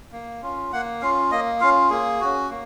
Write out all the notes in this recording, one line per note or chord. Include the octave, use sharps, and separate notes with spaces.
A#3
C#4 F4
A#3 F#5
C#4 F4 F5
A#3 D#5
C#4 F4 F5
A#3 G#4
C#4 F#4
A#3